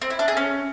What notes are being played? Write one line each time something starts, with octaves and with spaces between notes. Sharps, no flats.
C4
E4
D4
G#4
C#4